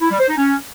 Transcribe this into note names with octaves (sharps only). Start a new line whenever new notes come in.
E4
G3
C5
D#4
C#4